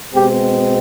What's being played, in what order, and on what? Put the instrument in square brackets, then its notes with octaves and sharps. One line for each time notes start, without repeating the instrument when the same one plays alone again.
[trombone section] B2 G#3 C4 G4